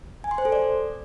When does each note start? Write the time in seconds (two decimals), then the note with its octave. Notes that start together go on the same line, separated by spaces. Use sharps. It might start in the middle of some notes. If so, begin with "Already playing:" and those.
0.24 G#5
0.31 C6
0.38 C5
0.45 A4
0.52 D5